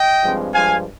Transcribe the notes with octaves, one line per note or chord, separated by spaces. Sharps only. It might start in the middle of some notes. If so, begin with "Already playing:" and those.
Already playing: D#5 G5
G2 F3 G#3 C4
G2 F3 G#3 F5 G#5